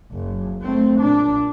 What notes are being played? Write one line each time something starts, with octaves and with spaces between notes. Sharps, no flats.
F#1
A3 C4
A#2 D4